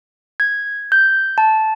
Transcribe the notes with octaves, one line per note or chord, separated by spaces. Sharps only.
G#6
G6
A5